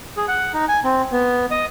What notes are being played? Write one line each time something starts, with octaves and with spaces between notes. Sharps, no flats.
G#4
F#5
D#4
G#5
C4
B3
D#5